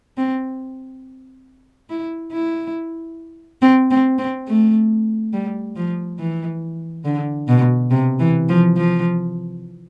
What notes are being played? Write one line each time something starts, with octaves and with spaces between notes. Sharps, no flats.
C4
E4
E4
C4
C4
C4
A3
G3
F3
E3
D3
B2
C3
E3
F3
F3